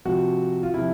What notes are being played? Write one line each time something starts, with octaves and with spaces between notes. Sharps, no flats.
C3 F3 F#4
F4
C3 F3 E4